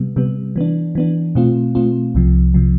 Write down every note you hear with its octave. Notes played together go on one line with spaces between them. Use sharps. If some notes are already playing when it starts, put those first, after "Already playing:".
Already playing: C3 G3 B3
C3 G3 B3
E3 B3 D4
E3 B3 D4
B2 A3 C4 F4
B2 A3 C4 F4
C2 C3 F3
C3 F3